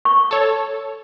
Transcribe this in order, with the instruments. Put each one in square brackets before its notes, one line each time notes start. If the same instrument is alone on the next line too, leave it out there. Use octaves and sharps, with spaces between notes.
[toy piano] C#6
[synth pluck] A4 C#5